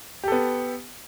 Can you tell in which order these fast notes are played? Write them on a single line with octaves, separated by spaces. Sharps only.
G4 A4 B3